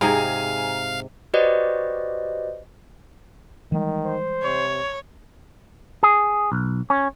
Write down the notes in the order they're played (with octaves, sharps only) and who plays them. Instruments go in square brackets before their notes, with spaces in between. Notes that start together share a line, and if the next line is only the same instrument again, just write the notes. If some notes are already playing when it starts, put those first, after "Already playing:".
[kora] G#2 C3 [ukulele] G#4 [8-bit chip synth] F5 [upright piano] G#5 A#5
[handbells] F#4 G4 B4 C5 D5 D#5
[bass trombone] D#3 [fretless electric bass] E3 G3 G#3
[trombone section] C5
[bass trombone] C3 [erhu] C#5
[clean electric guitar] G#4
B1
C#4